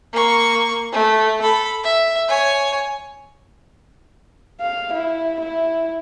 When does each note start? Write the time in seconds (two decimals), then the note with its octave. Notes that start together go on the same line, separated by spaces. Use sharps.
0.13 A#3 C#6
0.93 A3
1.42 A4 B5
1.84 E5
2.28 C#5 G#5
4.61 F5
4.93 E4
5.41 E4